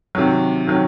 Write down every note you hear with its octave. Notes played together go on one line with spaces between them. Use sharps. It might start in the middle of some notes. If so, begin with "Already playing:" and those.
C3 D#3 F#3
C3 D#3 F#3